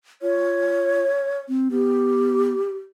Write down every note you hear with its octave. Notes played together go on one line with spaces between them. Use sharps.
F4 C#5
C4
B3 G4